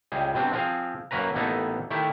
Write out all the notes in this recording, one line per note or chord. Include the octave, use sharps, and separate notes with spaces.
C#2 G3 G#4
B2 G3 C4 D4
F3 C4 G#4 F5
F#2 A#3 C#4 B4 A#5
A1 A#3 B3 D#4 A4
D#3 A3 E4 G4